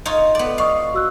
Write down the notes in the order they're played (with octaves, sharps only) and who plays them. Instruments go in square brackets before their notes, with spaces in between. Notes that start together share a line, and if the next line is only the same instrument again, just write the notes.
[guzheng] D#4 F4 C#5
B3 D5
[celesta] D#5 C#6 D#6 [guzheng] F5
[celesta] F#4 E6 F#6